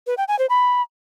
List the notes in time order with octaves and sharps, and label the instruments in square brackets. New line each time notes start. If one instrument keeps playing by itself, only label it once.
[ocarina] B4
G5
G#5
C5
B5